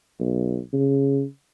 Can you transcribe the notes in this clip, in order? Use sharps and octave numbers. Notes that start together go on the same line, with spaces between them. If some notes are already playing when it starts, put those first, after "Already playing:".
B1
C#3